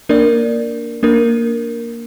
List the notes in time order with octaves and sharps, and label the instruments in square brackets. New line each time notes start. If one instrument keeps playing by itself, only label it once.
[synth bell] A#3 D4 A#4 D5
A#3 D4 A#4